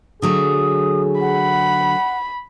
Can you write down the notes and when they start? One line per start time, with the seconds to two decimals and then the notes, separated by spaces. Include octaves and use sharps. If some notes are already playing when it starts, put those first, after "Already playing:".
0.22 D3 F#3 A3 G#4 D#6
1.21 F#5 B5